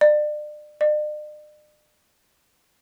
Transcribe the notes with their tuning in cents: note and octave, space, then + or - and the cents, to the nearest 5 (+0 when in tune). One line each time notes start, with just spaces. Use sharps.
D5 +35
D5 +45